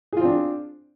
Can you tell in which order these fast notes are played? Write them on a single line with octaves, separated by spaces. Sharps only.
G#4 F4 C4 D4